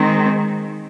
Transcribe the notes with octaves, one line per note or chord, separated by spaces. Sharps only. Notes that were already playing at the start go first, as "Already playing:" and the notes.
Already playing: D#3 G#3 C4